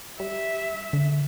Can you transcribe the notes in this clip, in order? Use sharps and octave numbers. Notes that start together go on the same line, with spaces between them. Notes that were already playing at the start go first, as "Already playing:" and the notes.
G3 E5
D3